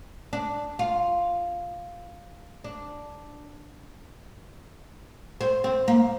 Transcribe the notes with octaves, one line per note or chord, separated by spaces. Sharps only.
D4
F4
D4
C4
C4
A#3